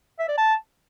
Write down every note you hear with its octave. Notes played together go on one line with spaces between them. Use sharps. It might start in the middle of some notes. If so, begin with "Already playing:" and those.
E5
D5
A5